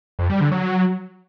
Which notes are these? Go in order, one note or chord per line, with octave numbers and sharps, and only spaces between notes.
F2
G3
D3
F#3